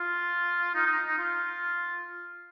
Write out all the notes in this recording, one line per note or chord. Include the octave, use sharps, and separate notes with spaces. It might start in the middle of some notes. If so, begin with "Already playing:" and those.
Already playing: F4
D#4
D#4
D#4
F4